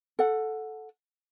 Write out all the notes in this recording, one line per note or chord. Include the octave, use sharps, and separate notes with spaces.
A4 F#5